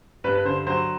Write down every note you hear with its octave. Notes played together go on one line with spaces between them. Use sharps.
G2 B4
B4
D3 C5
F#3 C5